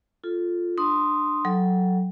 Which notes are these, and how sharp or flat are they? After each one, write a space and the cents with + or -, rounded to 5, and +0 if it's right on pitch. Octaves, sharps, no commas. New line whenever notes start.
F4 +0 A4 +0
D4 +25 C6 +0 D#6 +0
F#3 +0 A4 +0 G5 +0